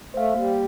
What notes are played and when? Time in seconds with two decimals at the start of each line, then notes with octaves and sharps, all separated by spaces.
0.14 A3 C5 F5
0.34 G3 A#3